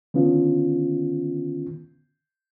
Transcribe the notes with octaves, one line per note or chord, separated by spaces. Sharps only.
D3 D#3 B3 C#4 F4